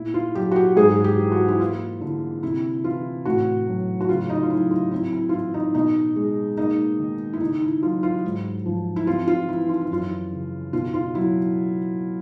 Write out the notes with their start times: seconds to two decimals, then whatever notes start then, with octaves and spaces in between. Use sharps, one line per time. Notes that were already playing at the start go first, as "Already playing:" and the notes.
Already playing: A#2 E4
0.14 F4
0.35 F#3 G4
0.51 F#4
0.56 G4
0.76 G#2 G#4
1.04 G4
1.18 E3
1.32 F#4
1.48 E4
1.59 A#3 F4
2.01 D3 E4
2.43 C3 E4
2.84 E3 F4
3.25 A2 F#4
3.67 F#3
4.01 F#4
4.09 C#3 F4
4.30 D#4
4.43 F4
4.50 F#3 E4
4.71 F4
4.91 C4 E4
5.13 E4
5.29 F4
5.33 E3 E4
5.54 D#4
5.75 B2 D#4
6.16 G#3
6.57 A#3 D#4
6.99 D#3
7.33 E4
7.41 C#3 D#4
7.62 E4
7.82 F#3 F4
8.03 F4
8.24 G#2
8.66 F3
8.96 E4
9.07 C4 F4
9.27 F4
9.48 E3 E4
9.69 F4
9.81 E4
9.90 F#2 F4
10.32 C#3
10.73 B2 F4
10.94 F4
11.15 F#3 E4